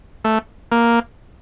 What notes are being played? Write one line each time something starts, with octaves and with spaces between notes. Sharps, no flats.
A3
A#3